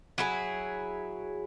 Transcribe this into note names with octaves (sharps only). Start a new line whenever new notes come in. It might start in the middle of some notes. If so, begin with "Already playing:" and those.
F#3 E4 G#4